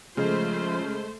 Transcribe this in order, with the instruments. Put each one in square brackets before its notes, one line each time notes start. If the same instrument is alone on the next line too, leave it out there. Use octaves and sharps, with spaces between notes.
[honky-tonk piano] C#3 [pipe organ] F3 [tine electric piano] G#3 G#4 D#5 [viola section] A3 C5